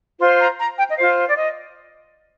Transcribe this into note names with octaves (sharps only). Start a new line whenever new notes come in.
F4 C5 C6
A#5
A#5
G5
D#5
F4 C5 F5
D5
D#5